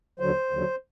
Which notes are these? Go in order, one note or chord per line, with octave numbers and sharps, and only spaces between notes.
D#2 D3 F#3 C5
D#2 D3 F#3